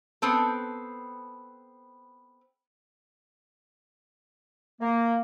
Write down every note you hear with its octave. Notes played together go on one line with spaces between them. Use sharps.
B3 C4 A4
A#3